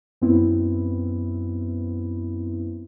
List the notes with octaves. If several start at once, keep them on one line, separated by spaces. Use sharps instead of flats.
F#2 B3 C4 E4